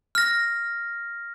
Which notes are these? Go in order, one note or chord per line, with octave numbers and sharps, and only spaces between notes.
F6 A#6